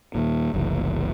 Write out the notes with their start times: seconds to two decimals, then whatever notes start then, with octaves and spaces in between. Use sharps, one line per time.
0.15 D#2 A#2
0.54 F#1 C2 E3